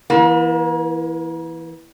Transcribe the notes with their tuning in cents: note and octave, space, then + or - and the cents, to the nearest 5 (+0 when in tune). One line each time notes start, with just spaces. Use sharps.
E3 +0 A#3 +40